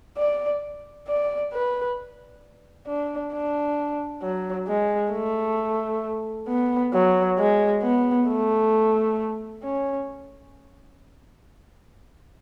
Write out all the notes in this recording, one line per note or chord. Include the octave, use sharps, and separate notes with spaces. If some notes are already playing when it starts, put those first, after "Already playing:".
D5
D5
B4
D4
D4
F#3
G#3
A3
B3
F#3
G#3
B3
A3
C#4